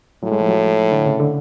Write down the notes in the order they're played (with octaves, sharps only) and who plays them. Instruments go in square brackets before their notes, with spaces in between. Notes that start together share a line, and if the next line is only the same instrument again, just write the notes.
[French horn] A2 [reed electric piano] F#3
[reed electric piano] G#3
F3
F#3
D3
C#3
D3